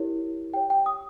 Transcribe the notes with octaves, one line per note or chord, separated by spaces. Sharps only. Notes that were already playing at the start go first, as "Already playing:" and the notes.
Already playing: E4 G4 A#4 C#5
G4 C#5 G5
G5
D#6